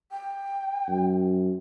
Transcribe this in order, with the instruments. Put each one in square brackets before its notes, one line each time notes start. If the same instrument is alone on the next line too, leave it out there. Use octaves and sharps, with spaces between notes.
[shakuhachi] G5
[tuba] F#2